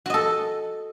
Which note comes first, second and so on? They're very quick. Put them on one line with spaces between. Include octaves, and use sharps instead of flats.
F#4 D#5 A4